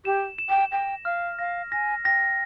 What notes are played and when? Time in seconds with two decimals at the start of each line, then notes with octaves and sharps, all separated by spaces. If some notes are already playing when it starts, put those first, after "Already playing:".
0.05 G4 E7
0.38 E7
0.49 G5
0.72 G5 A#6
1.05 F5 F6
1.39 F5 A#6
1.72 G#5 A#6
2.05 G5 A#6